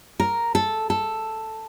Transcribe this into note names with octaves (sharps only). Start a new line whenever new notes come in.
A#4
A4
A4